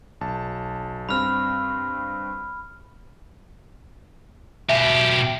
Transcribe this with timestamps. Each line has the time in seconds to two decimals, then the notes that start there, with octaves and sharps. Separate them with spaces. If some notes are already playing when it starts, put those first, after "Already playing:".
0.21 B1 A5
1.09 G2 C4 B5 F6
4.69 B2 G4 E5 G#5